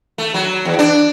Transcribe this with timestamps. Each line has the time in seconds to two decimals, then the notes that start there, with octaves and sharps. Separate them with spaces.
0.18 A3
0.34 F#3
0.65 E2
0.79 D4